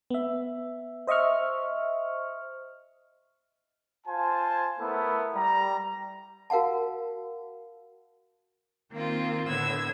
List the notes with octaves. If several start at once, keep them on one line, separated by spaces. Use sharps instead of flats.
B3 E5
C5 D#5 E5 C#6 F6
F4 C5 G#5 A5
A3 B3 E4 A4 A#4
G3 A#5
F#4 A#4 F5 F#5 A5
D#3 A#3 C4 F4
A2 D3 B3 E6 G#6